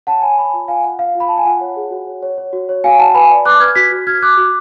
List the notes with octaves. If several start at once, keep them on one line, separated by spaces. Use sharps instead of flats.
C#5 F#5 A5
C#5 G#5 B5
C#5 G#5 B5
F4
F4 F5 G#5
F4 F#5
F4 F5
F4
B5
F4 A5
G#5
F4 F#5
C#5
G#4
F#4
C#5
C#5
C#5
F#4
C#5
F#4 F5 G#5
F#4 F#5 A5
B4 G#5 B5
D5
B4 D6 F#6
B4 F6 G#6
F#4 G#6 B6
F#4
F#4 F6 G#6
F#4 D6 F#6
F#4